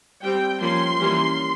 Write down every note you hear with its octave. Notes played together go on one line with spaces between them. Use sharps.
G3 C4 G5
F3 A#3 C#4 C6
E3 G3 A#3 C#4